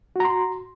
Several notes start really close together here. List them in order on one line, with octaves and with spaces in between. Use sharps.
F#4 A#5 C6